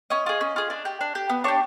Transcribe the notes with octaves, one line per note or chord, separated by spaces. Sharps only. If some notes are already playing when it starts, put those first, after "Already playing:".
C#4 D#5
F4 G#4
C#4
F4 G#4
D4
G4
D4
G4
B3
D4 G4 C#5